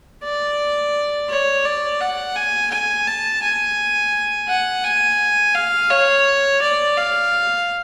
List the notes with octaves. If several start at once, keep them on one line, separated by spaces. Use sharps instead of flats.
D5
C#5
D5
F#5
G#5
G#5
A5
G#5
F#5
G#5
F5
C#5
D5
F5